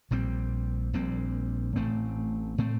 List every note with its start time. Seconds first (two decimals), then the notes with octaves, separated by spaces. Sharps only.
0.11 A#1 A#2 G3 C4
0.93 A#1 A#2 G3 C4
1.76 A1 A2 A3 C4
2.58 A2 A3 C4